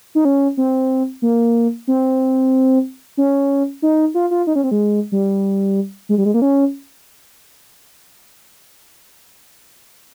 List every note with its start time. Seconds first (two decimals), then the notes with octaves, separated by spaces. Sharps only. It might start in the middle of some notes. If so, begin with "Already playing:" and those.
0.15 D#4
0.25 C#4
0.57 C4
1.22 A#3
1.88 C4
3.17 C#4
3.82 D#4
4.15 F4
4.31 F4
4.47 D#4
4.56 C#4
4.64 C4
4.71 G#3
5.12 G3
6.09 G#3
6.18 G3
6.25 G#3
6.34 A#3
6.42 C#4